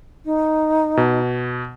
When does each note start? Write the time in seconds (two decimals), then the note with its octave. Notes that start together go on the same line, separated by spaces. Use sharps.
0.24 D#4
0.97 B2